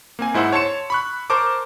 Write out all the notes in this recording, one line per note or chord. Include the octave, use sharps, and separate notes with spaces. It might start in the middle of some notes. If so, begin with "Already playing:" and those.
A#3 C4 G#5
G#2 E4 C5 F#5 E6
C#5 A5 C6 C#7 E7
B5 C#6 F#6
A#4 C5 A5 C#6 D6